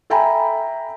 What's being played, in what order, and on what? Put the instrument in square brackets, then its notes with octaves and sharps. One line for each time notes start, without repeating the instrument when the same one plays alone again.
[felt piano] A4 E5 G5 G#5 A#5 B5